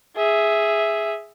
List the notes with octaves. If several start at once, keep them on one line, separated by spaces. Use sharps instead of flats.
G#4 E5